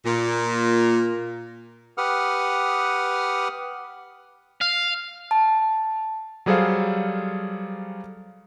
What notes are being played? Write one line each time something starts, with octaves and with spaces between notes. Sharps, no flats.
A#2
G4 B4 F#5 D#6 F6
F5
A5
F#3 G3 G#4 A4 C5 F5